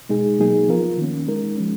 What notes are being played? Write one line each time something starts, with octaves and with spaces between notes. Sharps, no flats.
B2 G#3 D#4 G#4
B2 F#3 A#3 D#4 G#4
F3 B3 F4 A#4
D#3 A#3 C#4
G#3 D#4 A#4
F3 G#3 C#4